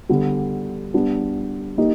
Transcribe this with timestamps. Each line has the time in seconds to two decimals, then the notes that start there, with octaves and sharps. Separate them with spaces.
0.09 D3 G3 B3
0.94 G3 B3 D4
1.78 A#3 D#4 G4